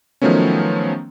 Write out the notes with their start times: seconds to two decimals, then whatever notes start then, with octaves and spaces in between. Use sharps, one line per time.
0.22 D#3 F3 F#3 A3 B3 C#4